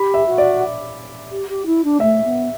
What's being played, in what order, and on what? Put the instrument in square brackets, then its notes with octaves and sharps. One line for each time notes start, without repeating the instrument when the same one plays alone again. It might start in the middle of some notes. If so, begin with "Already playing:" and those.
Already playing: [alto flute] G4 [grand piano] B5
[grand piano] E5
[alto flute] F#4
[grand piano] D5
[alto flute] G4
G4
E4
D4
[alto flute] A3 [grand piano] E5
[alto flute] B3